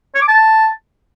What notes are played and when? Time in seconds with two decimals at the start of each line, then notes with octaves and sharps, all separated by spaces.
0.15 C#5
0.22 D6
0.28 A5